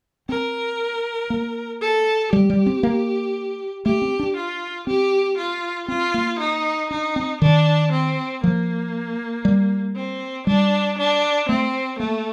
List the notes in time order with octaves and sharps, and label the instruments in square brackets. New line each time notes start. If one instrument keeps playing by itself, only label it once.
[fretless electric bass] C4 [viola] A#4
[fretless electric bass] A#3
[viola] A4
[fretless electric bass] G3 [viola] G4
[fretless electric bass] G3
C4
A#3
[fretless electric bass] A3 [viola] G4
[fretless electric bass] C4
D4
[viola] F4
[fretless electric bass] C4 [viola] G4
[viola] F4
[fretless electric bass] C4 [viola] F4
[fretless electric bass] A#3
[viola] D#4
[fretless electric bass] D4 [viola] D#4
[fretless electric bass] C4
[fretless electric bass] D#3 [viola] D4
[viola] C4
[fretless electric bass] F3 [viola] A#3
[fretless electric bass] G3
[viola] C4
[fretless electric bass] G3 [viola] D4
[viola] D4
[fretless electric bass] A3 [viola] C4
[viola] A3 [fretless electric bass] A#3